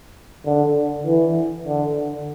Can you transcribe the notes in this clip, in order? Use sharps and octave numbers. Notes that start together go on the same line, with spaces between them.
D3
E3
D3